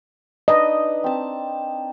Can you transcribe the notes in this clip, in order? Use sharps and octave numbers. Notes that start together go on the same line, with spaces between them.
D4 D#4 B4 D#5
C4 A5